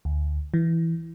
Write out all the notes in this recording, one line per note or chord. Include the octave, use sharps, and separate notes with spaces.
D2
E3